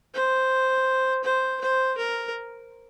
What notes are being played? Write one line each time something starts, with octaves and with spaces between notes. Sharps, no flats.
C5
C5
C5
A#4